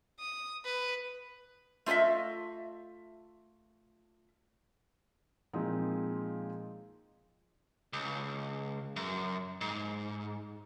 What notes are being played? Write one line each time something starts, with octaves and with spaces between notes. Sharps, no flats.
D#6
B4
A3 F4 C#5 D#5 E5
A#2 F3 G#3 C4 D#4
C#2
F#2
G#2